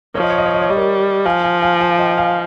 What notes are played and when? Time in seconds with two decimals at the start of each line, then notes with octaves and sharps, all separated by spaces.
0.15 F3 C#5
0.23 D#5
0.30 C#5
0.38 D#5
0.46 C#5
0.54 D#5
0.62 C#5
0.69 G3 D#5
0.77 A#4 C#5
1.25 F3 F5 G#5
1.43 F5 G#5
1.62 F5 G#5
1.81 F5 G#5
1.99 D#5 G5
2.17 F5 G#5